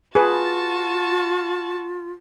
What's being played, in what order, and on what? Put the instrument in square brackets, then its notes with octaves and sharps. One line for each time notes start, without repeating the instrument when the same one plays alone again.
[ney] F4 [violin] F#4 A5 [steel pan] G#4 B4